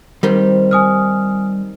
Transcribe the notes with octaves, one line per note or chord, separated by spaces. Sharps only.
D#3 G3 C4
G#5 D#6 F6